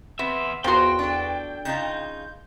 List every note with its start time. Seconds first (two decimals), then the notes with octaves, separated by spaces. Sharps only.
0.19 E2 B3 C4 E5
0.64 E2 F3 B3 F#4 A#4 C5 G5 C6
0.99 D4 A4
1.65 C#3 D#4 F4 G6